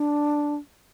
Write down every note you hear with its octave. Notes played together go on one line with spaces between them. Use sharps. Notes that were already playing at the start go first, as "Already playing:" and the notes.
Already playing: D4